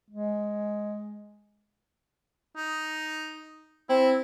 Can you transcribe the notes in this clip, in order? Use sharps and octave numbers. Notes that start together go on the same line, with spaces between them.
G#3
D#4
C4 E4